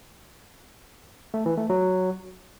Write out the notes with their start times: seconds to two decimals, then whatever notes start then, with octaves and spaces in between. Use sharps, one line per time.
1.34 A3
1.46 E3
1.58 A3
1.70 F#3